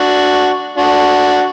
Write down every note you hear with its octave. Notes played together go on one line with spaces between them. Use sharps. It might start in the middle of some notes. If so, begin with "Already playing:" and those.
Already playing: D4 F#4
D4 F#4